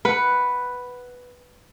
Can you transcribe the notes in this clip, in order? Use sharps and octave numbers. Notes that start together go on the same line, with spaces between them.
B4 F#5